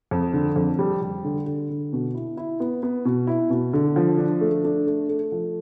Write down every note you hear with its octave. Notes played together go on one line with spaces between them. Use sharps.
F2
D3
F2
G3
G3
D3
D3
D3
B2
E4
E4
B3
B3
B2
E4
B2
D3
F3
D4
A3
D4
A3
A3
F3